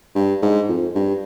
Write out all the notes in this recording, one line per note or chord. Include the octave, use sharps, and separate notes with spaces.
G2
G#2
F2
G2